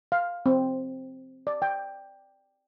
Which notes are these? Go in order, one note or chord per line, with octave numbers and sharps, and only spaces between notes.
F5
C4
D5
G5